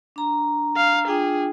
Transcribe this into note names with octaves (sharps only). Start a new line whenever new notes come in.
D4 A#5
F5
D4 F4 G#4 G5